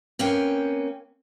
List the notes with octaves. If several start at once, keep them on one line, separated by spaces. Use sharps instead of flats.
A#3 C4 C#4 B4 G5